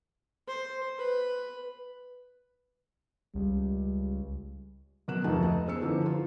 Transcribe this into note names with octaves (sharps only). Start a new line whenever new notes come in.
C5
B4
C#2 G3
B2 F#3 A#4 F#6 E7
F1 D2 F3 D#4 B4 A5
D#5
G1 C#4 G#4 C5 E6 C#7
D3 E3 F3 B3 D4 D#4
F4 C5